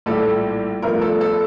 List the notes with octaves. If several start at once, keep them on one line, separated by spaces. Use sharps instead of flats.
A#1 A2 G3 A4
G1 G2 F3 A3 A#4
A4
A4